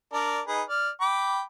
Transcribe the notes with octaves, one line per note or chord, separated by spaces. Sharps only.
D4 A#4 D5
D#4 G#4 B4
D5 F6
G5 B5 D6